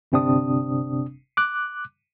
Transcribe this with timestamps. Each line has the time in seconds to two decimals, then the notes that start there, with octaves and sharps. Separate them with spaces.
0.12 G1 C3 C4 D4 D#6
1.37 D6 F#6